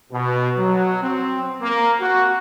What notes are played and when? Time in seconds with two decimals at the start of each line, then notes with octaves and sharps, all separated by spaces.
0.11 B2
0.57 F#3
1.02 C4
1.61 A#3
2.00 F#4